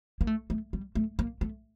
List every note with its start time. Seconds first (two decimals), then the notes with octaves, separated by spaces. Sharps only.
0.21 A#3
0.27 A3
0.50 A3
0.73 G3
0.95 A3
1.19 A#3
1.41 A3